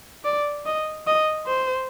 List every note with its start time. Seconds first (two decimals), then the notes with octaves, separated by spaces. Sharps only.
0.25 D5
0.66 D#5
1.07 D#5
1.47 C5